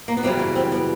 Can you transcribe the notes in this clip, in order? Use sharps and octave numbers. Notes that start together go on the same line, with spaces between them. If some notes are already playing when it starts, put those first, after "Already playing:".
A#3
B3
F#2 C#3 E3 G3 C4
C#4
C4
B3